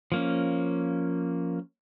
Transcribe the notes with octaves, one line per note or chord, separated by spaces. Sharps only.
F3 A#3 C#4